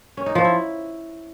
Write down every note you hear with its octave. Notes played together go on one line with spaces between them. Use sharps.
C#4
D#4
F3
E4